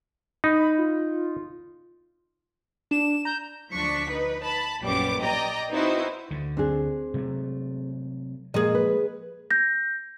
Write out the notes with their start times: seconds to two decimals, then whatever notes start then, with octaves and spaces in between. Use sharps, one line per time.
0.44 D#4 B5
0.78 F4
2.91 D4 E7
3.25 A#5 G6
3.70 D2 F3 D4 C#6 B6
4.08 D#4 B4
4.44 A5 B5
4.82 A#1 F#2 G3 B3 D6
5.21 D5 D#5 G5 A#5
5.71 C4 D#4 E4 F#4 B4 C5
6.31 D2 D3
6.57 C4 D4 G#4
7.14 C3 F#3 A3
8.54 A#2 F3 G#3 A#3 G#4 D#5
8.75 B4
9.51 G6 A#6